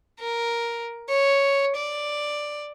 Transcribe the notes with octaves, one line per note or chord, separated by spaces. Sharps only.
A#4
C#5
D5